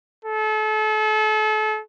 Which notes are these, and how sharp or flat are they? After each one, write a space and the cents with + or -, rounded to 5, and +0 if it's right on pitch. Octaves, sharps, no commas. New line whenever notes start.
A4 -35